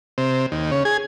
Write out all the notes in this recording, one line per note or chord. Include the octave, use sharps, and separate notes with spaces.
C3
D#2
C#3
G#4